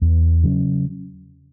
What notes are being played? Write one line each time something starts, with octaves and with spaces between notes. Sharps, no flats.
E2
C#3 F#3 C#4